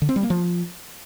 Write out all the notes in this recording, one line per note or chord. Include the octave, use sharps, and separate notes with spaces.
D3
C4
G3
A#3
F3